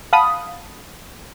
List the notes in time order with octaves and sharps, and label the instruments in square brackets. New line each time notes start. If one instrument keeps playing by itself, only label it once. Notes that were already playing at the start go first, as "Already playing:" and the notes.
[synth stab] F5 F#5 A5 B5 D#6